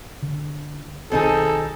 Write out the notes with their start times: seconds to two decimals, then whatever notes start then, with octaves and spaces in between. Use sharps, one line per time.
0.22 D3
1.11 B1 D#3 C4 D#4 G#4 A4